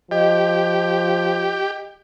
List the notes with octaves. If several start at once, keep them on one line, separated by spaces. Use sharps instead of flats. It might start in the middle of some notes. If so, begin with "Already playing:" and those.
F3 G4 D#5